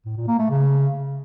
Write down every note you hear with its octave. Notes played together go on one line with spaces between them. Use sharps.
A2
A#2
A#3
A3
C#3